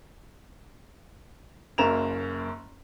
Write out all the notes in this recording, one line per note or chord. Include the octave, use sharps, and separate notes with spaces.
F#1 F#2 A#3 A#5 E7 F7